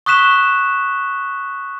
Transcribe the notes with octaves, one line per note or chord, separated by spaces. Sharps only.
C#6 D#6 F#6 B6 E7 G7